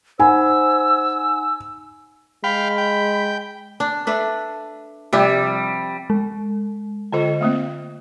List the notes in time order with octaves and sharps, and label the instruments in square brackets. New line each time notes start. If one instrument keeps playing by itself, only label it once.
[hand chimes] D#4 F#5 B5 [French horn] C5 [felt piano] G#5 [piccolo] E6
[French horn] G#3 [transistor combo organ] F5 G5 [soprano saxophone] B5
[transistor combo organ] G5
[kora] D4
A3 D4 B4
[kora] C3 F3 G4 [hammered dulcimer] G3
[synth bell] G#3
[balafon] D3 F4 A4 [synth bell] C5 D#5 G5
[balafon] A3 A#3 C4